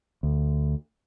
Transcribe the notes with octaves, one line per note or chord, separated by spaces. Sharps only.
D2